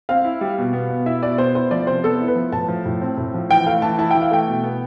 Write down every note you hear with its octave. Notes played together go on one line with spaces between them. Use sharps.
C4 F5
E4
G3
B2
B3
B2
E4 E5
B2 D5
B3 C5
E4 C5
F3 D5
C3 C5
B3 A4
E4
B4
F3
A2 A5
F3
A2
C4
A2
F3
E3 G5
A3 F5
E3 A5
E4 A5
E3 G5
F5
A3 G5
B2
B3